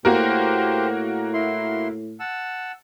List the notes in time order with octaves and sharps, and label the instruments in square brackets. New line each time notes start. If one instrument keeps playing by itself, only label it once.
[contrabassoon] A2 [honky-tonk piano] A#3 F#4 A#4 [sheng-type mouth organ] G4 C5
[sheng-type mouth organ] E4 C6
F#5 A5 E6